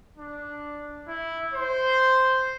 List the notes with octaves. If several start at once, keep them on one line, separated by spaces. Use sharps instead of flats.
D4
E4
C5